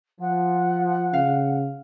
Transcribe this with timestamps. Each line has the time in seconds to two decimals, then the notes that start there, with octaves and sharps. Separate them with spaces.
0.21 F3 F#5
1.13 C#3 F5